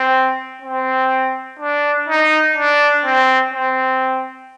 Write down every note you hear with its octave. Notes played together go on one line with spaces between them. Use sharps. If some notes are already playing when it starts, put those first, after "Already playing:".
Already playing: C4
C4
D4
D#4
D4
C4
C4